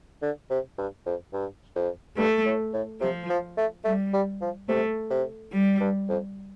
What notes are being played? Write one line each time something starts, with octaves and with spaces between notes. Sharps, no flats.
D3
C3
G2
F2
G2
F2
G2 A3
A2
A2
C3 F3
F3
A3
G3 A3
G3
F3
C3 A3
C3
G3
G2
F2